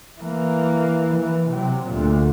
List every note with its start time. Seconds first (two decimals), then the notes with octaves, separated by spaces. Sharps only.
0.20 E3 A#3
1.15 E3
1.49 C3 F#3
1.87 D2 A#2